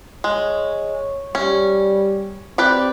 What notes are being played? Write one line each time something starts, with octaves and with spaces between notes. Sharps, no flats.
G#3 C#5
G3 C#4
C4 G4 B4 D5